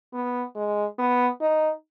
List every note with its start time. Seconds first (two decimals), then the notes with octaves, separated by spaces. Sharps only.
0.14 B3
0.56 G#3
0.99 B3
1.41 D#4